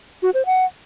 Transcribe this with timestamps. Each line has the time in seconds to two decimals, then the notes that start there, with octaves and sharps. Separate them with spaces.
0.23 F#4
0.34 C5
0.46 F#5